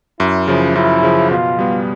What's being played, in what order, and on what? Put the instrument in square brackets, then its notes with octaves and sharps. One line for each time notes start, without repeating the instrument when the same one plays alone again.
[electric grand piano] F#2 [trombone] E4
[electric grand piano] C#3 F3
[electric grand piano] F#2 [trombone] E4
[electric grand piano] C#3 F3
[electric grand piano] B2 [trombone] F4
[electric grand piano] G3 B3